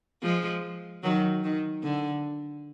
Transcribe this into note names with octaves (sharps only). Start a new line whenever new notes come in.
F3 G#3
D#3 F#3
D#3
D3